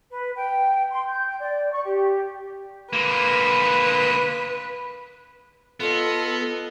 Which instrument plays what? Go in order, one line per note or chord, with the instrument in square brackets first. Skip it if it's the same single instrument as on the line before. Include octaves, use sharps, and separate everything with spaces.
[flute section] B4
G5
C6
G6
G5
D5
C#6
G4
[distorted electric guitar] D3 A#3 [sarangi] B4
[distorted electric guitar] B3 [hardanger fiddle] F4 D#5 [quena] A4